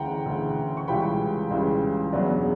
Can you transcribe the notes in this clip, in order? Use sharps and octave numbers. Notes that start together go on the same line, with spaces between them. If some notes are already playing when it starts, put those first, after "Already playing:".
Already playing: D2 C#3 E3 F#5 G5 A#5
D2 C#3 E3
C#6
C#2 C#3 E3 G3 G5 B5
C#2 C#3 E3 G3
E2 C#3 F#3 B3 D4